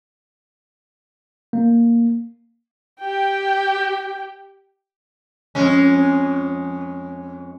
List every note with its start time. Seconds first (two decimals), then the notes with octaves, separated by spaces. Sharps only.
1.53 A#3
3.00 G4 G5
5.55 F2 G#3 C#4